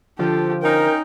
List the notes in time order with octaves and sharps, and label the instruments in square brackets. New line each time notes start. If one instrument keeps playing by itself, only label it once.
[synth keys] D3 F3 F4 [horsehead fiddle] G4 A4
[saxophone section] C#4 D#4 [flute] A#4 [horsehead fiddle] G5